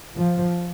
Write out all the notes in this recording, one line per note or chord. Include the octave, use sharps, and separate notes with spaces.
F3